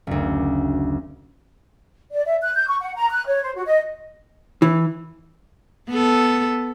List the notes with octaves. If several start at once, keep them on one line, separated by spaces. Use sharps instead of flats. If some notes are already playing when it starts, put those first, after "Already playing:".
F#1 D2
D5
E5
F#6
G6
C#6
F#5
A#5
F#6
C#5
C5
F#4
D#5
E3
B3 A4